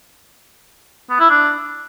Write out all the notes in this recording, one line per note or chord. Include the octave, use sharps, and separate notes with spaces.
B3
E4
D4